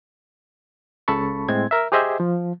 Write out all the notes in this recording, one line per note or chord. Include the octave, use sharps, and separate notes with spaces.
C#2 C#3 A4 A5 B5 C#6
A2 G#3 C4 G#6
A#4 E5
G4 G#4 C5 D#5 E5
F3